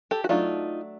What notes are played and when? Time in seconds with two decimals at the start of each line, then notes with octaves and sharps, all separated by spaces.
0.11 G4 A4
0.24 F#4
0.29 F#3 A3 D4 D#4 F4